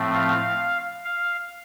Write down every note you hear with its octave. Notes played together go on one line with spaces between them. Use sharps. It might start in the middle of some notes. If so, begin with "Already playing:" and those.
Already playing: A2 F3 A3 C4
F5
F5